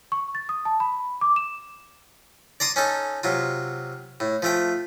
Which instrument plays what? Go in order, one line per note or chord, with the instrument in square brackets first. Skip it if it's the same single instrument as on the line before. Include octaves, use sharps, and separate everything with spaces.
[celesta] C#6
A6
D#6
A5
B5
D6
E7
[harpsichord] D5 A#5 C6 D#6
C#4 D#4 A4
C3 F#3 F4
A2
F3 A3 G5